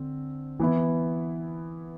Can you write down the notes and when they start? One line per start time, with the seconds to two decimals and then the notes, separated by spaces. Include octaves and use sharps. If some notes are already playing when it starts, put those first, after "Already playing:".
Already playing: D3 C4
0.60 E3 B3 E4